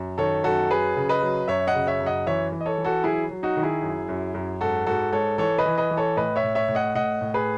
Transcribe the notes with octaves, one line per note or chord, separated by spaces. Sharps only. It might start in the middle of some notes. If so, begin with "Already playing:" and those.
Already playing: F#2
D#3 A4 C#5
F#2 F#4 A4
F#3 G#4 B4
C#3
B4 D#5
F#3
F#2 C#5 E5
D#5 F#5
C#3
C#5 E5
F#2
D#5 F#5
E3 C#5 E5
E3
D#5
A4 C#5
E3
F#4 A4
F#3 E4 G#4
F#3
D#4 F#4
D#3
E4 G#4
F#2
F#2
F#2
G#2 F#4 A4
G#2 F#4 A4
G#2 A4 C#5
E3 A4 C#5
B4 D#5
E3
B4 D#5
E3
A4 C#5
A2 B4 D#5
C#5 E5
A2
C#5 E5
A2
D#5 F#5
A2 D#5 F#5
A2
G#4 B4